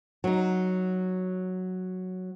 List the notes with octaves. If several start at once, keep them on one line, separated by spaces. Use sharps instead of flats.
F#3 D#4